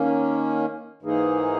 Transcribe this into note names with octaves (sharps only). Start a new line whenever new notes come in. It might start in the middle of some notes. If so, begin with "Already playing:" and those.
Already playing: D#3 A#3 C#4
G#2 E3 A#3 D#4 G#4